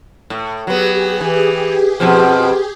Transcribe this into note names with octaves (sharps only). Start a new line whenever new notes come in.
A2
F#3 B3 G4 G#4
E3
F2 B2 F3